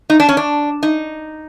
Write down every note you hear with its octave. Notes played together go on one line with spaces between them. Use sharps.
D#4
D4
C#4
D4
D#4